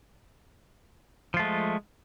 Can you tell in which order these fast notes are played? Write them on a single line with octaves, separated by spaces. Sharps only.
F3 F4 A3 G#3